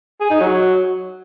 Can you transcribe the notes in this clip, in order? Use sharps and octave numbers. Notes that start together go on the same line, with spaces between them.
G#4
D#4
F#3